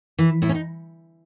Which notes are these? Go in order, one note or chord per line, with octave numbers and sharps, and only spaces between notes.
E3
A2 E4
C#4
D#4